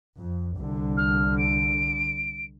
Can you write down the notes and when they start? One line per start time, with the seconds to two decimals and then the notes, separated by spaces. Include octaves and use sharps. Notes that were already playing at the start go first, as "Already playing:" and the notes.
0.19 F2
0.56 C2 D3
0.97 F6
1.38 D7